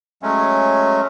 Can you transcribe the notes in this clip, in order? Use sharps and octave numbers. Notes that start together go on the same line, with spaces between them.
F#3 G#3 A3 C#4